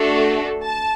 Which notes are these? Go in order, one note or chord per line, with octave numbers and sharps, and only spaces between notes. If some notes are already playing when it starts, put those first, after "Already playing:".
Already playing: A3 D4 F#4 A4
A5